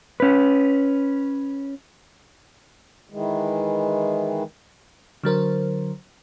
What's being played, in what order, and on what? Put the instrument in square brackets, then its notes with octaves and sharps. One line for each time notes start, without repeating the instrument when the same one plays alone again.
[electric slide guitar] C#4 B4
[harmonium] D#3 E3 G#3
[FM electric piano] D3 F#3 A#4 C5